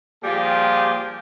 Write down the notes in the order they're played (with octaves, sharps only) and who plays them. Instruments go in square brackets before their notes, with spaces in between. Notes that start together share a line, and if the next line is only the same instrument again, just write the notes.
[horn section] A#2 F3 G3 F4 G4 G#4